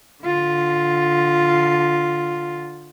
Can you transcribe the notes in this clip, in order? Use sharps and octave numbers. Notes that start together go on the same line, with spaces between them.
D3 F4